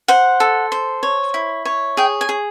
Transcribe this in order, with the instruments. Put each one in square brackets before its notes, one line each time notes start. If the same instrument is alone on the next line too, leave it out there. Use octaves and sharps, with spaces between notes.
[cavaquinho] C5 F#5
A4
C5
C#5
E4
C#5
G#4 G5
G#5
G#4